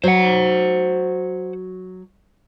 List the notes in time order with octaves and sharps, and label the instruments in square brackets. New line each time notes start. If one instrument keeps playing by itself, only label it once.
[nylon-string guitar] F#3 [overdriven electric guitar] C5 F#5